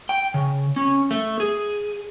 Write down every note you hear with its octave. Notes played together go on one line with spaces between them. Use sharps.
G5
C#3
C#4
A3
G#4